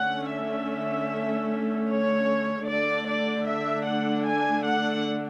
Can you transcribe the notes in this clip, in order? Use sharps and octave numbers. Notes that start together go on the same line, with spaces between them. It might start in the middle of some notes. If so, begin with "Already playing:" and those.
Already playing: D3 A3 C#4 F#5
E5
C#5
D3 A3 D4 D5
D5
E5
F#5
G#5
F#5